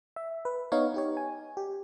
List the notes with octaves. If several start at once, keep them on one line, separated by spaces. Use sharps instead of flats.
E5
B4
B3 D#4 C#5 F5
D#4 G4 C#5
G#5
G4